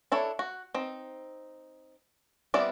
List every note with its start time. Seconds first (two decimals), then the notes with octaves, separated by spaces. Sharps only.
0.12 D4 E4 A4 C#5
0.39 F#4
0.74 C4 D#4
2.54 G3 B3 C4 E4 D5